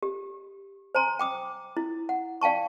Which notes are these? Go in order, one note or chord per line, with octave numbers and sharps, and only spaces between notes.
G4
C5 G#5 A#5 C6
G5 D6 D#6
E4
F#5
D5 F5 G5 A5 C#6